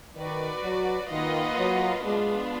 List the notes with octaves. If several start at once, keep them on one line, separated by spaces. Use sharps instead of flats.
D#3 F#4 B4 D5
F#3
D#3 A#3 F4 B4 D#5 F#5
F#3
G#3 B3 D4 F4